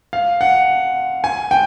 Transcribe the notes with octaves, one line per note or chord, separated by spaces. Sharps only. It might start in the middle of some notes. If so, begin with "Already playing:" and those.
F5
F#5
G#5
G5